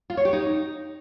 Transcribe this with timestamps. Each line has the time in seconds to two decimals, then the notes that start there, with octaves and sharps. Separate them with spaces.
0.10 F4
0.17 C#5
0.25 G4
0.33 D#4